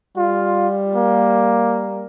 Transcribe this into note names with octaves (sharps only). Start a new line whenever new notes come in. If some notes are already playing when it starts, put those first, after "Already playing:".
G3 F4
A#3